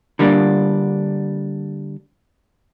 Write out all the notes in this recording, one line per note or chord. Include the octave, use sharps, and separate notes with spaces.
D3 G3 A#3 D4